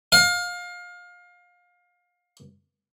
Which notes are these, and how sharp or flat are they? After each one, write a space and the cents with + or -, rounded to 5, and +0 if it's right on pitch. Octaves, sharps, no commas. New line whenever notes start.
F5 +25